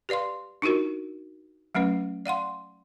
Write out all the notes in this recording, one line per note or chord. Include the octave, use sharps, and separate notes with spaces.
G4 B4 D5 F5 C6
D4 D#4 F4 F#4 A#4
F#3 A3 C#4 B4
D5 F5 F#5 C6